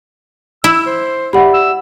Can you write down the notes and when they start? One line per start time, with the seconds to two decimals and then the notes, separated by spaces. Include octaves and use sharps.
0.64 E4 E6
0.86 C5
1.33 G4 D5 E5 F#5 B5
1.54 E6